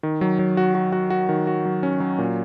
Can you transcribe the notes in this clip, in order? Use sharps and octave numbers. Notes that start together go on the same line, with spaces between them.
D#3
F#3
F#3
F#4
F#4
F#4
F#4
D#3
F#4
F#3
C#4
F#3
A#2